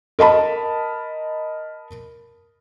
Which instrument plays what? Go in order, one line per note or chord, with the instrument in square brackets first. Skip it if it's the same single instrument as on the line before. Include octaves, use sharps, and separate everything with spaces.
[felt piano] A#4 D#5 A5 B5